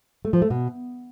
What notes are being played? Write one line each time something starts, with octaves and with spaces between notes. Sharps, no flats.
A3
F3
A3
B2